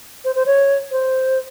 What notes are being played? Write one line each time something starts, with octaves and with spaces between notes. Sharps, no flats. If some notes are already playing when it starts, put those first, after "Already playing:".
C5
C5
C#5
C5